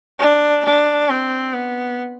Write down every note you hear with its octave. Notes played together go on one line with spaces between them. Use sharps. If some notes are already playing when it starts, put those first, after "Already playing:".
D4
D4
C4
B3